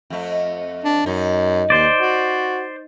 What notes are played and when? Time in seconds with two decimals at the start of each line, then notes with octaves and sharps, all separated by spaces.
0.10 F2 A3
0.84 D4
1.06 F#2 D#4
1.70 D#2 C5 D5
1.98 F#4